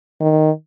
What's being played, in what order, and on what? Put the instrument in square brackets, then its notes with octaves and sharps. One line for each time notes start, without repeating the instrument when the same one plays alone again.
[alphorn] D#3